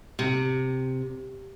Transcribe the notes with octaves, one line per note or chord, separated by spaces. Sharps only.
C3